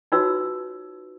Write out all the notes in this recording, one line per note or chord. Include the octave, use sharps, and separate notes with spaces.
D#4 F4 F#4 B4 C#5 E6